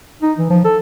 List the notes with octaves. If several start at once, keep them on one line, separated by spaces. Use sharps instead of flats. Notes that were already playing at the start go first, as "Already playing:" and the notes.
D#4
E3
F3
A4